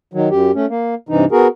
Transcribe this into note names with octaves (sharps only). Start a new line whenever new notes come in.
D#3 F#3
F#2 G4
A3 C#4
A#3
G2 C3 E3 D#4
B3 F#4 G#4 A#4